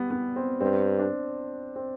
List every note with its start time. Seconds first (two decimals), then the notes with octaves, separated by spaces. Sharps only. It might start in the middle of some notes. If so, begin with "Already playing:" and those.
Already playing: G3 B3
0.10 B3
0.36 C4
0.60 G2 C4
0.99 D4
1.76 C4